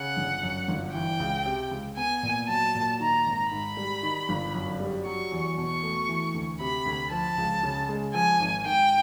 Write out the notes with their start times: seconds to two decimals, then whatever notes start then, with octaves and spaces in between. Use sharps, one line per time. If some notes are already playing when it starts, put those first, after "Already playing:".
Already playing: C#3 F#5
0.17 G1
0.43 F#2
0.68 G1
0.94 E3 G5
1.20 C#2
1.46 C3
1.71 C#2
1.97 B3 G#5
2.23 A#2
2.48 F#3 A5
2.75 A#2
3.00 D#3 A#5
3.26 G#1
3.51 G#2 B5
3.77 G3
4.03 D#3
4.29 G1
4.54 F#2
4.80 G3
5.05 F#3 C#6
5.32 E2
5.57 B2 C#6
5.83 A3
6.09 E3
6.34 D2
6.60 C3 B5
6.86 D2
7.11 F3 A5
7.38 C#2
7.63 C#3
7.89 G#3
8.15 F3 G#5
8.40 G#1
8.66 G#2 G5